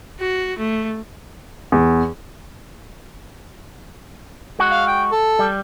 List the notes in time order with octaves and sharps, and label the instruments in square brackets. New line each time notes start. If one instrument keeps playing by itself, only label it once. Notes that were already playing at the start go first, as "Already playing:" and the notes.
[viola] F#4
A3
[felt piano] E2
[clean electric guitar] G#3 F#4
[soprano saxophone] F5
G5
A4
[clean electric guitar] G3